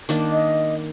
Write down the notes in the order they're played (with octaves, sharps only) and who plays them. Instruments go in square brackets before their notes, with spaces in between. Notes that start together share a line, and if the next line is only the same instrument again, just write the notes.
[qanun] D#3 A#3 D4
[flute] D#5